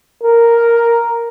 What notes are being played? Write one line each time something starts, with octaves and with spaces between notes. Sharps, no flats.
A#4